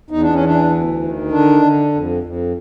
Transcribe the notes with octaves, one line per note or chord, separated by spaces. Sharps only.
E2 D#4
D4
C#4
E3 D4
D2
D#3
D3 D4
D3
F2
F2